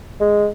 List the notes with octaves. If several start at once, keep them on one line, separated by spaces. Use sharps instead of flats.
G#3